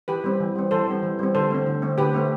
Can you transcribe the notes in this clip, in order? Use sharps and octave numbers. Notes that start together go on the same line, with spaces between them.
E3 G4 B4
G3 C4
E3
G3 C4
E3 A4 C5
G3 C4
E3
G3 C4
D3 A4 C5
A3 C4
D3
A3 C4
D3 G4 B4
A3 C4